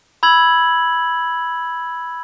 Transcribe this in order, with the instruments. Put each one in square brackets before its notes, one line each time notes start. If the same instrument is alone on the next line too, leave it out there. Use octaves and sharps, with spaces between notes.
[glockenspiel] B5 E6 G#6 F#7